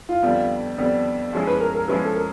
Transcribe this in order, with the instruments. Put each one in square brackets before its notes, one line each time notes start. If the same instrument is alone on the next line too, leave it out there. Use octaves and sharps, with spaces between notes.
[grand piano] F4
[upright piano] F2 D3 G3 B3
F2 D3 G3 B3
F3 G#3 C#4 E4 G#4
[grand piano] B4
A#4
A#4
[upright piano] F3 G#3 C#4 E4 G#4 [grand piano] B4
[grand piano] A4
A#4